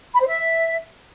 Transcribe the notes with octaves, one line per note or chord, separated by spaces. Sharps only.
B5
C5
E5